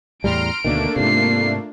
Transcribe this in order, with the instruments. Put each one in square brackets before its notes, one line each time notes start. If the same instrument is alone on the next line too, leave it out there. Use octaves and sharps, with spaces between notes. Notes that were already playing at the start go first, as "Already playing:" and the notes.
[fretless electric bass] E2 A2 G3 [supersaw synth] A#5 C6 F6 [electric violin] D7
[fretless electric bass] D2 B2 D#3 [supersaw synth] A3 A#3 D4
[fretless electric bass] G#2 C3 [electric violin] F4 C7